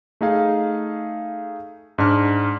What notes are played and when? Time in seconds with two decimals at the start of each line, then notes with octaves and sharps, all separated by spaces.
0.21 A3 D#4 G#4 F5
1.98 G#2 D4 F6